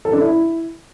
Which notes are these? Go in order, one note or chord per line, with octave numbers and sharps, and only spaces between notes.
A4
D4
E4